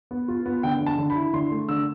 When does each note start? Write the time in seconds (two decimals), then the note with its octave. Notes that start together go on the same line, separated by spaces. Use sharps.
0.11 B3
0.28 F4
0.46 B3
0.63 D3 G5
0.81 D3
0.86 A5
0.98 D3
1.10 B5
1.16 E4
1.33 D3 C6
1.51 A3
1.69 D3 E6